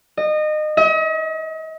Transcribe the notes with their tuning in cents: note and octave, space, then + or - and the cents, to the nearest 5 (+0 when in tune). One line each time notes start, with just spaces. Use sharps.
D#5 -25
D#5 +40